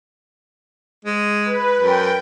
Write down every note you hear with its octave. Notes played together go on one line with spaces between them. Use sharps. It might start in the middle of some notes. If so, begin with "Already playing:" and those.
G#3
B4
F#2 G5